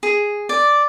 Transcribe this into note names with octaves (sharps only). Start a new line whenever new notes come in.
G#4
D5